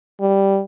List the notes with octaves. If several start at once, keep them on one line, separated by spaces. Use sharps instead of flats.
G3